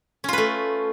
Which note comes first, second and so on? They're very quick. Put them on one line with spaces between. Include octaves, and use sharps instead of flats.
C#4 F4 B4 A3